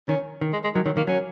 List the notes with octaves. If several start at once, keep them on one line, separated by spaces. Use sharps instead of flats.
D#3 C#4
D#3
G#3
G#3
D#3 F#3
D#3 F#3
D#3 A#3
F#3 C#4